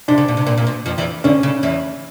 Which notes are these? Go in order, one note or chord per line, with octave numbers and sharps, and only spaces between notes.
C3 D4
C#3
B2
C3
A#2
A#2
B2
F2 F3
E2 E3
D2 D3 C#4
C#3
E2 E3